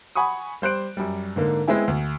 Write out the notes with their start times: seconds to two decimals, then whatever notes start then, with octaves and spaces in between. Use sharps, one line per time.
0.15 F#5 G#5 B5 C#6 D#6
0.62 G3 C5 F#6 D7
0.97 F#2 G3
1.36 G#2 D3 A#3
1.68 G#3 B3 C4 E4 G#5
1.88 D2